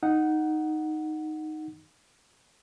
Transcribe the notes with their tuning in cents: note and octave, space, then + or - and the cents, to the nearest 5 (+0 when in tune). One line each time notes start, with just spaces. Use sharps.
D#4 +0 F#5 +0